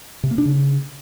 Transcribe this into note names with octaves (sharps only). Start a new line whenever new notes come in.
C3
A#3
D4
C#3